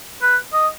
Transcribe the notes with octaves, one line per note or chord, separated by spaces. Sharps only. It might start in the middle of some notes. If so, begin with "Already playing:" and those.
B4
D#5